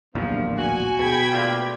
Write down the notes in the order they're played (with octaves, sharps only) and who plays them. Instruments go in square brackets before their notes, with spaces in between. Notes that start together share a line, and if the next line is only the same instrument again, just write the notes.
[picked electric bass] D1 A#1 E2 [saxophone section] C3 F3 [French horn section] A#3 B3 D4
[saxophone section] F#4 [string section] G#5
[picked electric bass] B2 [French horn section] G#4 [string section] G5 B5 G#6
[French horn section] D2 A3 D5 [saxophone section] A#2 D3 F4